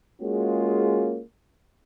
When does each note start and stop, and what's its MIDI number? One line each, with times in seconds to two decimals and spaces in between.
0.22 1.21 56
0.22 1.21 58
0.22 1.21 61
0.22 1.21 65
0.22 1.21 66
0.22 1.21 68